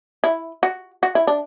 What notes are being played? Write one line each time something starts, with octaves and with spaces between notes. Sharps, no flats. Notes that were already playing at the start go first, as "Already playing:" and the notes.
E4
F#4
F#4
E4
D4